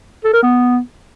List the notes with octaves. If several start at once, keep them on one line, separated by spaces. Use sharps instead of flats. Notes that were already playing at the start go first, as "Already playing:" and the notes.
A4
A#4
B3